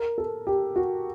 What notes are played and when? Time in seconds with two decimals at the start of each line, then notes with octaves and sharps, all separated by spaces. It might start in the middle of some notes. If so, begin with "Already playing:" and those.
Already playing: A#4
0.18 A4
0.47 G4
0.76 F#4